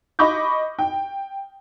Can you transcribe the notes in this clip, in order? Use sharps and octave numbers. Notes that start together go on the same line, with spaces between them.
D#5 B5 C#6 D6 G6
G5